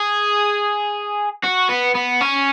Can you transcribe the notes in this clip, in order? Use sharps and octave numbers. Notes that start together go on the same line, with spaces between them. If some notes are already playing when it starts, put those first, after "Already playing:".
Already playing: G#4
F#4
B3
B3
C#4